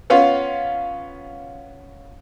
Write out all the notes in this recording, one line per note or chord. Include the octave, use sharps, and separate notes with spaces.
B3 C#4 F4